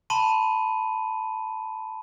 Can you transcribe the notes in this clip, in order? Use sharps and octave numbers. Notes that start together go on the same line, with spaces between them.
A5 B5 C6 D#7